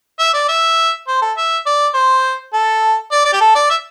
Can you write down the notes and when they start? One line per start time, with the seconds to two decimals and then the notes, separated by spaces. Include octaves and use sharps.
0.19 E5
0.34 D5
0.49 E5
1.08 C5
1.22 A4
1.37 E5
1.66 D5
1.94 C5
2.54 A4
3.12 D5
3.25 D5
3.33 G4
3.41 A4
3.56 D5
3.70 E5